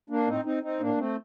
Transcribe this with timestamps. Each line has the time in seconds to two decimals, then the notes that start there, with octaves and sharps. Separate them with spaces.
0.10 A#3 D4
0.27 A2 C4 D#4
0.45 C4 D#4
0.63 C4 D#4
0.80 A2 A#3 D4
0.98 A3 C4